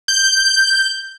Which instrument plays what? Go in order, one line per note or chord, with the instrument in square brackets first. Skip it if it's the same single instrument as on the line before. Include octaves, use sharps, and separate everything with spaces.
[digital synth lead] G6